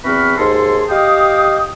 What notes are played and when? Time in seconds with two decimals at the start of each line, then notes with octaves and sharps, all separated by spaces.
0.04 E2 E3 C4 F#4 B5 F6
0.38 D#2 G#2 G#4 A4 C6
0.90 G4 D#5 F5 G5 D#6